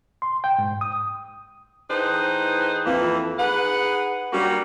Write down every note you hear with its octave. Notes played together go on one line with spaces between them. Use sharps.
C6
G5
G#2
D#6
A2 E3 D#4 G#4 B4 C5
F2 E3 A#3
D#4 G#4 B4 F#5
F#3 G3 A#3 C#4 D4 F#4